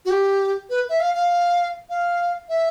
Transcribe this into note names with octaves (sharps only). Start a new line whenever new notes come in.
F#4
G4
B4
E5
F5
F5
F5
E5